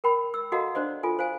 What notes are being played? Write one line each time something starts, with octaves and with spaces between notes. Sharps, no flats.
A#4 G5 B5
E6
F#4 A4 D#5 F5 F#5 A#5
D4 C5 D5 D#5
F4 A4 G#5
C5 F5 G#5